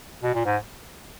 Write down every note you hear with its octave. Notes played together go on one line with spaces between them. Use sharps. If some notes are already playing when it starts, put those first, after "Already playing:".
B2
A#2
G#2